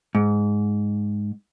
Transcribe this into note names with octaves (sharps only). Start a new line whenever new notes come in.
G#2